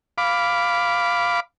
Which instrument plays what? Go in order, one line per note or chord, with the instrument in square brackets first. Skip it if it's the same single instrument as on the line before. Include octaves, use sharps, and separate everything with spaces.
[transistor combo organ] F5 B5 D6